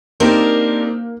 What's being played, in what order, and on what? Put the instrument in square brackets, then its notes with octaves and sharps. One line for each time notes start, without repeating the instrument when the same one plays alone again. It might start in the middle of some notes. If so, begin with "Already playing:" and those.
[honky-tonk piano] A#3 [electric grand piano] C4 D#4 G4 [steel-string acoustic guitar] D4 A#4 C5